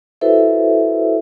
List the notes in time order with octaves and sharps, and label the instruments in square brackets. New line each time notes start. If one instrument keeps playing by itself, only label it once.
[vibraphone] E4 F#4 A4 B4 C5 E5